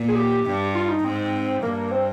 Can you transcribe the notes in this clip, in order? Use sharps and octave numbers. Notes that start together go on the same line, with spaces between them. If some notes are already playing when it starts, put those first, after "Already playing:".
Already playing: A#2
G#4
G4
G2
F4
D#4
G#2 C4
G2 A#3
C4